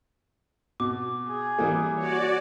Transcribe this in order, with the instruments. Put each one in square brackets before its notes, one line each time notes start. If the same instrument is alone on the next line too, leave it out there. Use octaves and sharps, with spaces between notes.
[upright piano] B2 [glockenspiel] D6
[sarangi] G#4
[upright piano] E3 G3 A#3
[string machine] F#4 D5 [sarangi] C#5